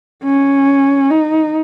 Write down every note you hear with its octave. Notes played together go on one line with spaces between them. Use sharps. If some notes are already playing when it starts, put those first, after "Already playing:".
C#4
D#4